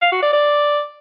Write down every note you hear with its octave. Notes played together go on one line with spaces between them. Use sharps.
F5
F#4
D5
D5